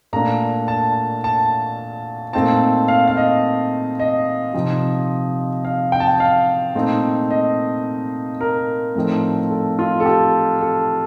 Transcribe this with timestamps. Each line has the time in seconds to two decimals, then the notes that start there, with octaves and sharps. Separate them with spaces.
0.13 A#2 A3 D4 A#5
0.68 A5
1.24 A5
2.33 A#2 A3 C4 D#4 A5
2.88 F5
3.07 F5
3.17 D#5
3.99 D#5
4.54 C3 F3 C4 D#4
5.65 F5
5.92 G5
6.00 A5
6.07 G5
6.20 F5
6.75 A#2 A3 C4 D#4
7.31 D#5
8.41 A#4
8.95 A2 F3 A3 C4 D#4
9.50 A4
9.79 F4
10.00 A4
10.06 G4
10.61 A4